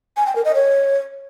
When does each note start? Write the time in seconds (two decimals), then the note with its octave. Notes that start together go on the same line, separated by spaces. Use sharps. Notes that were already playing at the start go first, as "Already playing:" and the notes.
0.17 G#5
0.26 G5
0.36 A#4
0.45 D#5
0.54 C#5